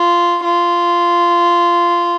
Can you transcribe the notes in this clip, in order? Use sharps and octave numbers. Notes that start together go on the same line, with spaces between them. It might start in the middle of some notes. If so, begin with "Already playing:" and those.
Already playing: F4
F4